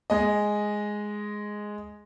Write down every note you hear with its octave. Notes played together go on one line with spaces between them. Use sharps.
G#3 G#4 D#5